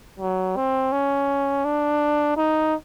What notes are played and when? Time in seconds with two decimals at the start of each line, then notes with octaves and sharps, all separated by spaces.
0.20 F#3
0.56 C4
0.92 C#4
1.65 D4
2.37 D#4